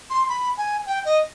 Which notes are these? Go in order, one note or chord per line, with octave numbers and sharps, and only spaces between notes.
C6
B5
G#5
G5
D#5